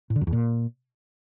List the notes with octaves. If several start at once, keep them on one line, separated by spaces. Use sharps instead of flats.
A2
D3
F#2
E2
A#2